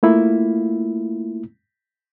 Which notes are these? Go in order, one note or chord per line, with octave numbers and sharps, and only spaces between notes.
A3 A#3 E4 F4